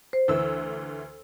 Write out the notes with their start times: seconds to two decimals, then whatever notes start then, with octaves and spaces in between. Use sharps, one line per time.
0.13 C5
0.28 D2 E3 E6